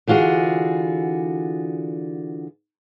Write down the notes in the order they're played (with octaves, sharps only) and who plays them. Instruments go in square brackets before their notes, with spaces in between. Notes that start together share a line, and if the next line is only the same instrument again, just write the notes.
[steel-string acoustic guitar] D3 E3 F4 F#4 G#4